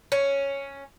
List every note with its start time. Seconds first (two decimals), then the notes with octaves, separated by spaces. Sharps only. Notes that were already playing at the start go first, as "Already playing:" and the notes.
0.12 C#4